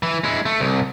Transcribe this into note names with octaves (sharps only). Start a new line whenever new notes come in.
E3
G#3 E4
A3
C2